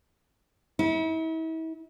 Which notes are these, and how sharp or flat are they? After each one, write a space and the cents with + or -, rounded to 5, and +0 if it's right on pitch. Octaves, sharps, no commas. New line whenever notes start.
E4 -40